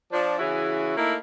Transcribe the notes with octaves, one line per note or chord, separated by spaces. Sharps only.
F3 D4
C#3 E3 C#4 E4 F#4 G#4
A3 A#3 D#4 E4